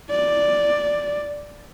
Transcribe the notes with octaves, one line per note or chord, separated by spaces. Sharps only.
D5